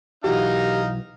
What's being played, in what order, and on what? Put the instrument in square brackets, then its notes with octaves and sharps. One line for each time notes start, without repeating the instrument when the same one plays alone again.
[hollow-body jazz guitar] B1 E3 F#4 [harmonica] D#4 F5 A#5 [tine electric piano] G4